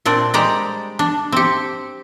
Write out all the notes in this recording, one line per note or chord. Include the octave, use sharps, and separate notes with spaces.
A#2 C4 D4 D5
G3 G#3 C5 D5 G5 A#5
D4
C4 G4